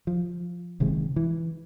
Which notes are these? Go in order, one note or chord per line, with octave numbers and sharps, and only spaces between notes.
F3
F#1 C3 D#3 G#3
E3